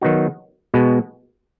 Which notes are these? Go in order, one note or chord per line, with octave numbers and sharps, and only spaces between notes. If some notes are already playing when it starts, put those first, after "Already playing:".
D#3 F#3 B3 D#4 F#4
B2 G#3 B3 F#4